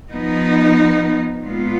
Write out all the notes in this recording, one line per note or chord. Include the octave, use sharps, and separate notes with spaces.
F3 B3 D#4
A#2 G#3 B3 F4